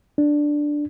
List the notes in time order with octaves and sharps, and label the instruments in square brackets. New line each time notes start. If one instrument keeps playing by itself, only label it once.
[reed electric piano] D4